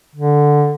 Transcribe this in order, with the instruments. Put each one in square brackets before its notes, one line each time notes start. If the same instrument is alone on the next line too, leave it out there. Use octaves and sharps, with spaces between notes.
[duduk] D3